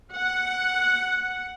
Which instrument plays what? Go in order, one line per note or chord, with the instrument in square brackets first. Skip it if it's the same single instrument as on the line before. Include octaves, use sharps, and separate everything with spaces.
[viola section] F#5